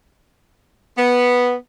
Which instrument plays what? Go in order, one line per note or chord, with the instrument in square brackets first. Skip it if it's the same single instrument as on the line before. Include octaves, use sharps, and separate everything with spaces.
[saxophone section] B3